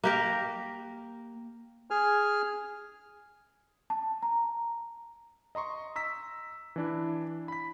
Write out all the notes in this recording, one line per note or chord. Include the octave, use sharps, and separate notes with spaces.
A#3 G4 A#4
G#4 G#5 F6
A5
A#5
D#5 A#5 C6 C#6
A#5 E6 B6
E3 D4 E4
B5 B6